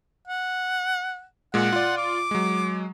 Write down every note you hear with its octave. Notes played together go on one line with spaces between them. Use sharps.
F#5
A#2 G#3 F#5
F4 D5
D6
F#3 G#3